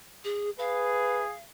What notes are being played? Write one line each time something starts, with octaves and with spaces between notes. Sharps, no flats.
G#4
G#4 B4 F5